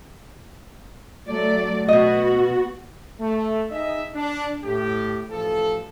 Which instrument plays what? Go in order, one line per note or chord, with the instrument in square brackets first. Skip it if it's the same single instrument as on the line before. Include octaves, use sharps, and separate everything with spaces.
[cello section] F#3 A3 D5
[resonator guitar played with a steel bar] B2 D#5 [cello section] B3 F#4
[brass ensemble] A3
D#4 G#4 D#5 E5
D4
A2 G4
A1 F3 A4